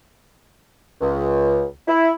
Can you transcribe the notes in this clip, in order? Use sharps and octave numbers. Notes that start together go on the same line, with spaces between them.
C#2
E4